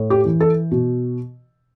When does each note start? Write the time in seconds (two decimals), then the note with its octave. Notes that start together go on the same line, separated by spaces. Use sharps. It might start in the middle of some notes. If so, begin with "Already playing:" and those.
Already playing: A2
0.10 G4
0.25 E3
0.40 A4
0.71 B2